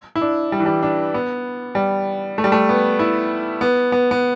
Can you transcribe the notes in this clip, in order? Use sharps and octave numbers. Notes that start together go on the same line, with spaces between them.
E4
D4
G3
E3
G3
D4
B3
G3
A3
G3
A3
B3
E4
B3
B3
B3